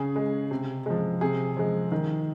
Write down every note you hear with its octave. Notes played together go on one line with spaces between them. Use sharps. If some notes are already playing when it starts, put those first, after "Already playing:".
Already playing: C#3 G#4
G#3
C3
F3 G#3
C3 G#4
F3 G#3
D#3